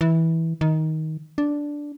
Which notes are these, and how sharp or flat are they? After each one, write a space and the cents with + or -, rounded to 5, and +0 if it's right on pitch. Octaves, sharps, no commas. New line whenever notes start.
E3 -15
D#3 +15
D4 -5